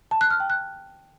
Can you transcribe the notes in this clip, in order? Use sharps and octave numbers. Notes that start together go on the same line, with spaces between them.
A5
F#6
F6
G5
F#6